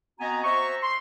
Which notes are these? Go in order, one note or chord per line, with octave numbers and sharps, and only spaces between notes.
B3 C4 F#4 D#5 G#5 A#5
F#4 C5 E5 A#5 C#6
C6